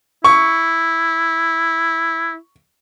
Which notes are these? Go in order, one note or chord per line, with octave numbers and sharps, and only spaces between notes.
E4 C#6